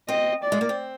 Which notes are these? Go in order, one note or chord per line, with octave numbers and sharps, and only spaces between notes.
C4 D#5
D5
G#3
A#3
C4